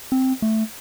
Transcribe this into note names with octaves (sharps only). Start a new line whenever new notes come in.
C4
A3